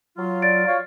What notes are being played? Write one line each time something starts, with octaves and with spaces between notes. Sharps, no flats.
F#3 F4
D5 A6 D7
F4 C#5 F5